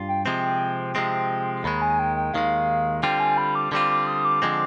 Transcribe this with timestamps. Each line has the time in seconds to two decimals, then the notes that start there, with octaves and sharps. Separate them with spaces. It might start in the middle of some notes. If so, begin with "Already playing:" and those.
Already playing: G2 F4
0.08 G5
0.26 C3 F3 G#3 C4 G5
0.95 C3 F3 G#3 C4
1.64 D#2 D#3 G#3 B5
1.82 G#5
1.99 G5
2.16 G5
2.34 D#2 D#3 G#3 F5
3.03 D3 G3 C4 F4 G5
3.20 G#5
3.38 B5
3.55 D6
3.72 D3 G3 C4 F4 D6
3.90 D6
4.07 D#6
4.25 D6
4.42 D3 F3 G#3 C4